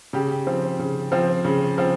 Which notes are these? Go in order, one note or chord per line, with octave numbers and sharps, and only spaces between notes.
C#3 G4
F3 C4
C#3
F3 C4
C#3
F3 C4